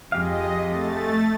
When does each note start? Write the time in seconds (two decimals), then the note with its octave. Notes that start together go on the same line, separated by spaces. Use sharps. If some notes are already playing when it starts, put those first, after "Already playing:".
0.12 F2 G#3 G4 D#5 F5
0.66 A3 A6